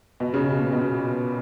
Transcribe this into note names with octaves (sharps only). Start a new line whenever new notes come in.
B2
C#3
A#2
B2